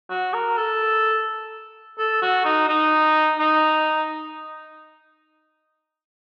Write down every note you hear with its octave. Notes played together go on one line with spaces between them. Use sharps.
F#4
A#4
A4
A4
F#4
D#4
D#4
D#4